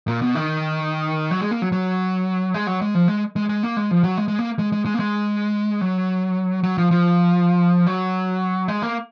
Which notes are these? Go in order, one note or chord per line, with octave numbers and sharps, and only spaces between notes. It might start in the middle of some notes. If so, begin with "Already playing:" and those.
A#2
B2
D#3
F#3
G#3
A#3
F#3
F#3
G#3
F#3
G#3
F3
G#3
G#3
G#3
A#3
G#3
F3
F#3
G#3
G#3
A#3
G#3
G#3
G#3
A#3
G#3
F#3
F#3
F3
F3
F#3
G#3
A#3